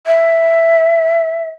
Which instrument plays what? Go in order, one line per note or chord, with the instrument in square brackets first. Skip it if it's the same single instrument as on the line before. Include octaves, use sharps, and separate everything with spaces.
[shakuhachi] E5